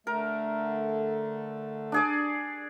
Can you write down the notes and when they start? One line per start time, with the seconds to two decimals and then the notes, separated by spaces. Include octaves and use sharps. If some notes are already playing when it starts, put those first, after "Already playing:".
0.07 D3 A3 A#4
1.92 D4 G#4 D5